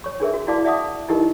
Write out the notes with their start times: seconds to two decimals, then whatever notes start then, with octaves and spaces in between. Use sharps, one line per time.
0.04 C#5 C#6
0.20 D4 G#4 A#4 E5
0.33 F#4
0.47 E4 F#4 D5 F5 A5 D6
0.64 D5 E5 F#5 A5 D6 D#6
1.08 D#4 E4 G4 A#4 D#5